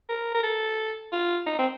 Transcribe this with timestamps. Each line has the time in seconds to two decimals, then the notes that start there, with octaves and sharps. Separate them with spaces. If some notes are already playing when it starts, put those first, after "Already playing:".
0.09 A#4
0.34 A#4
0.43 A4
1.12 F4
1.46 D#4
1.59 C4